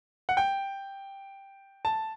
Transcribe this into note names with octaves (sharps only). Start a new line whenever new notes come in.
F#5
G5
A5